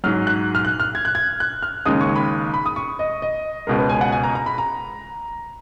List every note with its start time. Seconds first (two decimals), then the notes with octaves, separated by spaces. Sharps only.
0.04 G#2 F#3 F6
0.27 F#6
0.55 F6
0.65 F#6
0.80 F6
0.95 G#6
1.05 F#6
1.15 G#6
1.40 F#6
1.62 F6
1.85 D#2 C#3 G#3 D#6
2.01 C#6
2.16 B5
2.54 B5
2.66 D#6
2.76 C#6
2.99 D#5
3.22 D#5
3.67 C#2 B2 G#3 A#4
3.78 B4
3.90 G#5
4.01 F#5
4.12 G#5
4.23 A#5
4.35 A#5
4.46 B5
4.58 A#5